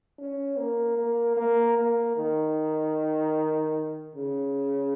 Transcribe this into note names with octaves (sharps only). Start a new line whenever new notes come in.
C#4
A#3
A#3
A#3
A#3
D#3
C#3